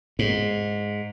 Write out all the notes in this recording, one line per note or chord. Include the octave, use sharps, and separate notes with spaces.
G#2